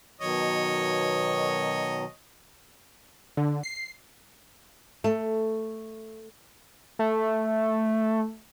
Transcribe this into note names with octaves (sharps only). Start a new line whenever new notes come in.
B2 D#3 F#3 C#5 D#5
D3
C7
A3
A3